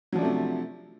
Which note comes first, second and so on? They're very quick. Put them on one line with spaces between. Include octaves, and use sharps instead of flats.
F#3 F3 D4 A3 C3